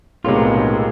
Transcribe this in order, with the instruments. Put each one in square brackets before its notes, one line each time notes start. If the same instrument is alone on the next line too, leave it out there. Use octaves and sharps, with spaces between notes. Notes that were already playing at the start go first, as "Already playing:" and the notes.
[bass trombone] B1 [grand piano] A2 C3 [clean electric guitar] G#3 F4 [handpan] G#4 A#4 C#5